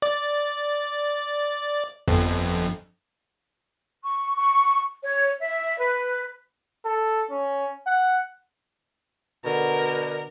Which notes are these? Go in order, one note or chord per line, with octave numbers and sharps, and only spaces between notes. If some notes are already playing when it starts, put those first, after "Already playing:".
D5
G1 F2
C#6
C#6
C#5
E5
B4
A4
C#4
F#5
B2 D3 A#4